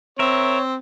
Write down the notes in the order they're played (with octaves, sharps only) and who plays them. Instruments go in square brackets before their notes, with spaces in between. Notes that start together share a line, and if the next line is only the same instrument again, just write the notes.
[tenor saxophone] C4 [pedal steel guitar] A#4 E5 [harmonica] C#5